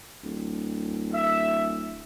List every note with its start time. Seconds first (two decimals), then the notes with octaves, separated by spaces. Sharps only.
0.23 D1
1.13 E5